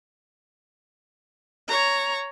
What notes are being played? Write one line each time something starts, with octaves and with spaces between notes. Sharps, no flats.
C#5 A#5